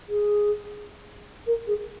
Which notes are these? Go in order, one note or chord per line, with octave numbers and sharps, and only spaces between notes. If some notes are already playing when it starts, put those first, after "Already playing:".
G#4
A#4
G#4